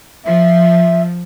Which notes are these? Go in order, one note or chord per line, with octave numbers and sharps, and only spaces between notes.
F3 E5